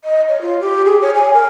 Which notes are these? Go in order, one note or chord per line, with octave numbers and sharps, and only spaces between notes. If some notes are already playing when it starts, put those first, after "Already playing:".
D#5
C#5
F4
G4
G#4
C#5
G#5
A#4